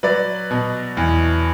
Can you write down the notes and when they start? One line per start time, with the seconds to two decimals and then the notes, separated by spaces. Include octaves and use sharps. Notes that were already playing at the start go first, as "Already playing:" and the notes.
0.03 F#3 B4 D5
0.51 B2
0.97 E2